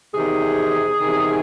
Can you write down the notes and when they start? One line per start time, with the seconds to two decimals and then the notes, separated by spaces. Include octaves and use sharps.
0.14 E2 C3 D#3 G#4
1.01 E2 C3 D#3